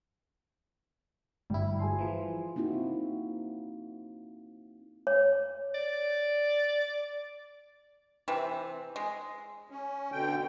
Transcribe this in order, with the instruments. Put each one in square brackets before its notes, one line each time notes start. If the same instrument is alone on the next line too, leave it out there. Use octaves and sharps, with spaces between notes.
[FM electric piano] G1 E4 [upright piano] G3
[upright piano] G#4 G#5 C6
[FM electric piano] E3 F3
[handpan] A#3 C4 D#4 E4 F#4
[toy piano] C#5
[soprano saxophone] D5
[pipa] C3 E3 C4
G#3
[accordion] C#4
B2 D3 G5